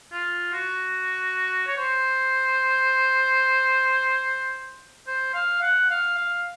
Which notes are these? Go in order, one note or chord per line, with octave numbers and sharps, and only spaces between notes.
F4
F#4
C#5
C5
C5
F5
F#5
F5
F5